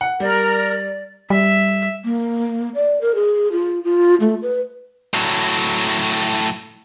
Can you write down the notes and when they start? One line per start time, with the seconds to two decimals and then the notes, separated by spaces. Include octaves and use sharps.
0.01 F#5
0.20 G3 A#4 D5
1.30 G3 E5
2.05 A#3
2.75 D5
3.01 A#4
3.15 G#4
3.52 F4
3.84 F4
4.21 A3
4.43 B4
5.14 A2 F#3